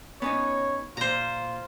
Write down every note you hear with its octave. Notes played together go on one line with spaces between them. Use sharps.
B3 C#4 D#4 C#5
A#2 F4 C5 A#5